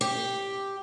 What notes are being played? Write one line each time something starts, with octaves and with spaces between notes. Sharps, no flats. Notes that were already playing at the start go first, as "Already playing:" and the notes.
G4